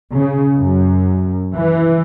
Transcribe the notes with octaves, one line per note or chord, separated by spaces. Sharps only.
C#3
F#2
E3